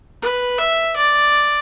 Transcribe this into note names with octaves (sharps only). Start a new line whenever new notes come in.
B4
E5
D5